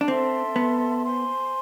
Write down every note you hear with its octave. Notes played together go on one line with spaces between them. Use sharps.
D4
C4 A4 E5 A5 C6
B3
C5 G#5 C6